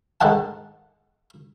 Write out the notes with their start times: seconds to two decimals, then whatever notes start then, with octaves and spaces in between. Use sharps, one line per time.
0.21 G#2 D3 D#3 F#5 A5